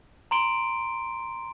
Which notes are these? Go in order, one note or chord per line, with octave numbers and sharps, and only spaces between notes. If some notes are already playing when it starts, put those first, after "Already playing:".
A#5 C6 D7 G7